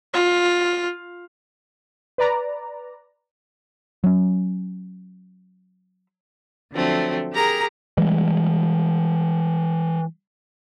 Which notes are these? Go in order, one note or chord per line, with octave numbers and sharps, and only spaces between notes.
F4
B4 D5 A#5
F#3 C#4
D3 F3 F#3 A3 C4
G4 G#4 A#4 A#5
E3 G3 G#3